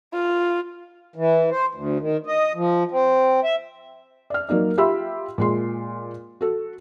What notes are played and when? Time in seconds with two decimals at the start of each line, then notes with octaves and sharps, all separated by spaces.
0.13 F4
1.16 E3
1.51 C5
1.74 D2
2.00 D#3
2.26 D#5
2.55 F3
2.91 C4
3.44 E5
4.30 D5 F6
4.49 F#3 A#3 D#4 D5
4.78 F4 G4 E5 B5 C6 E6
5.38 A#2 G#3 C6
6.41 F#4 A4